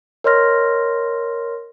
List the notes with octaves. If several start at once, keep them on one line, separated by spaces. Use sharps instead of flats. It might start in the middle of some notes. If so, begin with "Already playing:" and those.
A#4 C#5 D#5 C6 F6 A#6